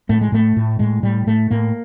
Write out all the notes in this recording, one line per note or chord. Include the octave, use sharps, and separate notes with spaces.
A2 A3
G#3
A2 A3
A2
A2 G#3
A2 G3
A2 A3
A2 A#3